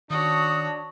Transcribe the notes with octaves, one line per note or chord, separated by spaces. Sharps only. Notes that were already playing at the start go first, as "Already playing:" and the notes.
D#3 D4 F#4 C#5 D#6